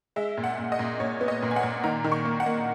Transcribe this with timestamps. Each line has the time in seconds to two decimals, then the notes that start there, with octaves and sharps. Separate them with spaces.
0.16 G#3 E5
0.37 A#2
0.44 F#5
0.59 A#2
0.72 D#5
0.79 A#2
1.00 A#2 C#5
1.21 B3
1.28 D#5
1.42 A#2
1.51 G#5
1.56 F#5
1.63 A#2
1.84 D#3 A#5
2.04 D#3
2.12 C#6
2.25 A#3
2.40 F#5
2.46 A#3